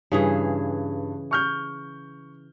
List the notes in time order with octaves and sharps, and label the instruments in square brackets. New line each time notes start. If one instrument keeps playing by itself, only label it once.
[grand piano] G2 [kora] C#3 E3 G#4
[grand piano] C#6 F6 G6